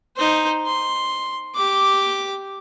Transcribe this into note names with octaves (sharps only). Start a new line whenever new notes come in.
D#4 C5
C6
G4 D6